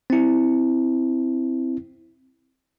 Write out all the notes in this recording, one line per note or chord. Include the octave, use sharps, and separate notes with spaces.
C4 E4